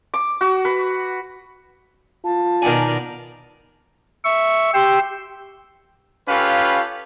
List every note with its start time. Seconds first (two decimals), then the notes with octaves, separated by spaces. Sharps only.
0.14 D6
0.41 F#4
0.65 B4
2.25 F4 A5
2.62 B2 D#3 A#4 D5 G#5
4.25 E5 C#6
4.74 G4 G5 C6 E6
6.28 C#4 F4 G4 A4 B4 F5